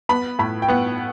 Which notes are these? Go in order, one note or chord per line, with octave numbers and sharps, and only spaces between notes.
B3 B5
A2 B5
G5
B3 F#5